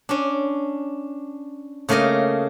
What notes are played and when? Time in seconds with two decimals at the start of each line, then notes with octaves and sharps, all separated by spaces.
0.09 C#4 D4
1.89 C#3 A3 A#3 A#4 D#5